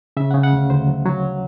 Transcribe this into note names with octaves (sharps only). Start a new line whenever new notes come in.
C#3 E5
C#3 F#5
F#5
D2 F5
D2 C5
F#3
F#3